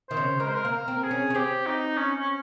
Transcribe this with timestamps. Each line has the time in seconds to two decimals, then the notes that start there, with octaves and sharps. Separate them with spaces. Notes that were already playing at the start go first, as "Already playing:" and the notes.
0.09 D#3 C5
0.17 C#3
0.40 G#3 A#4
0.48 C5
0.55 A#4
0.65 A#3
0.72 A#4
0.88 C4
0.97 A#4
1.03 G#4
1.11 C#4
1.30 C#4
1.35 C4 G4
1.66 D#4
1.97 C#4
2.19 C#4